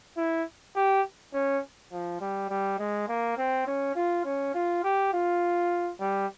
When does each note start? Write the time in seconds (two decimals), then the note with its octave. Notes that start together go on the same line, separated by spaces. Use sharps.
0.17 E4
0.75 G4
1.33 C#4
1.92 F3
2.21 G3
2.49 G3
2.78 G#3
3.08 A#3
3.37 C4
3.67 C#4
3.95 F4
4.24 C#4
4.54 F4
4.83 G4
5.13 F4
6.00 G3